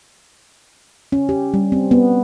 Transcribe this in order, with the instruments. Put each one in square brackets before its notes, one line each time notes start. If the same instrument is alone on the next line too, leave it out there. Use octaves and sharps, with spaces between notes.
[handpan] C#4
G4
G3
C4
B3